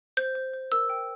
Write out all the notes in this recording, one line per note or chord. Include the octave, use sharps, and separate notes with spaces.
C5 G6
C5
C5
A#4 E6
G5